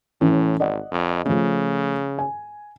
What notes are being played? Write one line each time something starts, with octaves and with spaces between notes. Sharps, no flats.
A2 E3 C#4
G#1 D5 D#5 F#5
F2
C#3 F3 A3
G#5